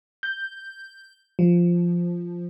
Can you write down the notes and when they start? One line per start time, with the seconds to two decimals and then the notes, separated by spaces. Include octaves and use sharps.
0.23 G6
1.39 F3